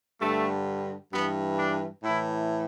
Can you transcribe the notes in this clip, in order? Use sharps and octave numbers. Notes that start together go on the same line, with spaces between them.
G2 D3 A3
G2 E3 B3
D4
A2 E3 E4